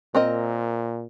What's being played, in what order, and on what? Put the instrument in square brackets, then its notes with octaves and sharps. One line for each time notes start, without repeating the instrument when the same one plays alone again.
[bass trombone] A#2 [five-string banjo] C4 A#4 D#5